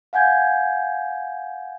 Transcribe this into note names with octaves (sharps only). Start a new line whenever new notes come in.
F5 F#5 G#5 G6 G#6